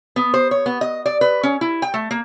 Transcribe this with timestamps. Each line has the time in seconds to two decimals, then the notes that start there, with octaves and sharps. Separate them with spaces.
0.16 B3
0.34 C5
0.51 C#5
0.66 B3
0.81 D#5
1.06 D5
1.21 B4
1.43 C#4
1.61 E4
1.82 G5
1.94 A3
2.11 A#3